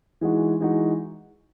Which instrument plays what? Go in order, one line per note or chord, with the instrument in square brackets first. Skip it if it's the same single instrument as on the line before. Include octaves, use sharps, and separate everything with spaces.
[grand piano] E3 G#3 D#4 F#4
E3 G#3 D#4 F#4